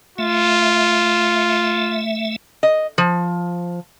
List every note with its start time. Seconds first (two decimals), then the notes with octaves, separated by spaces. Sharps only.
0.18 A3 F4 E5
2.63 D#5
2.98 F3